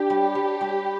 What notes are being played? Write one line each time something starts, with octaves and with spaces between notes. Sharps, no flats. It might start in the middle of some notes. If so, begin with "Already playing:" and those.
Already playing: D4 G4 B4
G3
G3
G3